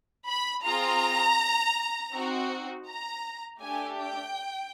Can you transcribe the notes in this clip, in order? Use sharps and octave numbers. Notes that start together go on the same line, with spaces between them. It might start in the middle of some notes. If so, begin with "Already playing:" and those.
B5
C4 F4 G#4 A#5
C4 D#4 F#4
A#5
A3 D4 G4 G#5
G5